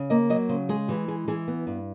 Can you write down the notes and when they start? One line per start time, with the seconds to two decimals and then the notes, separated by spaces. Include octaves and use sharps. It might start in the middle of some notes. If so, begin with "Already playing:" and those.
Already playing: C#3
0.10 A#3 D#5
0.30 F#3 D#5
0.49 C#3 C5
0.69 G#3 G#4
0.88 E3 G4
1.08 G#3 G#4
1.28 E3 G#4
1.48 B3
1.67 G2